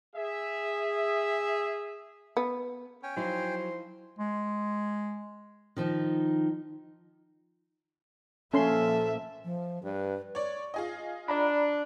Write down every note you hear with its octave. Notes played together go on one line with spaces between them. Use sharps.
G#4 E5
B3
C#4 G5 G#5
F3 F#3 D#4 E4 C5
G#3
D#3 F3 D#4
A#2 F3 A#3 C#4 A4 E5 C6
F3
G2 B4
C#5 D5
F4 G#4 D#5
D4 D5 A#5 B5